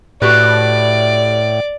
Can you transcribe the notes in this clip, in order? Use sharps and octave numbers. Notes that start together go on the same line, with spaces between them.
A2 F#4 G4 B4 D5